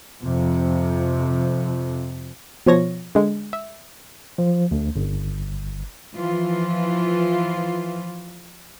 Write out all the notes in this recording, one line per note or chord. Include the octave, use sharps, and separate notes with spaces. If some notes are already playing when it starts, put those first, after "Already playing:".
F2 C3
B2 F3 C#5 A#6
D3 G#3
E5
F3
D2
G1
E3 F3 F4